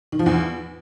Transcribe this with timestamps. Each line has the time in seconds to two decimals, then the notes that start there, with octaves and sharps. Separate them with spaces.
0.12 D#3
0.19 F3
0.26 E2